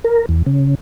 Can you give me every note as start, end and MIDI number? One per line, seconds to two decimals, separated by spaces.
0.04 0.26 70
0.29 0.43 40
0.46 0.75 49